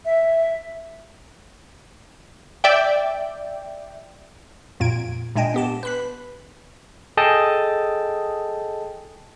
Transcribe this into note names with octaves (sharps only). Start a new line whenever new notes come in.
E5
D5 E5 G5
F2 A#2 G#6 D7
A#2 G#3 D4 D#5 G5 G#5
B3 G4 A5
B4 B5 B6
G#4 A4 D#5 G5 A5 D#6